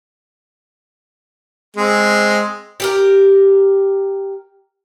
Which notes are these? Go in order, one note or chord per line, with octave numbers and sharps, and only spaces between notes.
G#3 C4
G4 A4 A#4